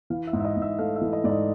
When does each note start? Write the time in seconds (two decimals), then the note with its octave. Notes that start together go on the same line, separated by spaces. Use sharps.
0.10 E3 F5
0.27 E5
0.33 G#2
0.40 E5
0.45 D#5
0.57 G#2
0.62 E5
0.79 A3 F5
0.96 E5
1.02 E3
1.13 D#5
1.24 G#2 D5
1.29 D#5